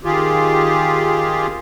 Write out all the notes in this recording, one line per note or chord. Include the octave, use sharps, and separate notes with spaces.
D#3 F4 G4 G#4